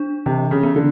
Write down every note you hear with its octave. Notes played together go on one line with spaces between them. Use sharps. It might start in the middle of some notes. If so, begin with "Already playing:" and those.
Already playing: D4
C3 E3
C#3
B3
D3